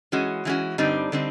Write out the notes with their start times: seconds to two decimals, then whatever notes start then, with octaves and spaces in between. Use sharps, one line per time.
0.12 E3 G#3 C#4 F#4
0.45 E3 G#3 C#4 F#4
0.78 G2 D3 G3 C4 D#4
1.12 D3 G3 C4 D#4